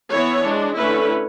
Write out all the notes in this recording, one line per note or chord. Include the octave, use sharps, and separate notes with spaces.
E3 B3 E4 C#5
G#3 D4
D3 A3 C#4 E4 B4